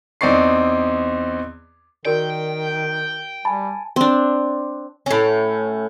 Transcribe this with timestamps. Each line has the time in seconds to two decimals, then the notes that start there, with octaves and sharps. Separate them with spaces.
0.21 E2 C4 D#4 D5 C#6 C7
2.05 D#3 F#4 A#4 D5 G5
3.45 G3 G#5 A5 B5
3.96 C4 D4
5.06 A2 C#4